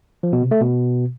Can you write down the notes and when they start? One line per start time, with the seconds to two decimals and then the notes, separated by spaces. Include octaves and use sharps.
0.23 F3
0.33 B2
0.42 C3
0.51 A3
0.61 B2